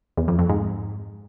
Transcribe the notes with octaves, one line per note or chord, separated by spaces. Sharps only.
E2
F2
F2
G#2